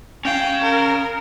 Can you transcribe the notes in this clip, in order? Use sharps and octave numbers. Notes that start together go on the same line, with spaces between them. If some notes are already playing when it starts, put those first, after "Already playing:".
C#4 F5 G5
A#4